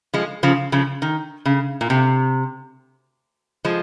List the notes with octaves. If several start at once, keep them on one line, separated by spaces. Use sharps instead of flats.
F3 G#3
C#3 F3
C#3 F3
D#3
C#3
A#2
C3
F3 G#3